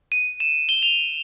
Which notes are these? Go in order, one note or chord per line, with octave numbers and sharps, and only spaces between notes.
D#7
E7
G7
F7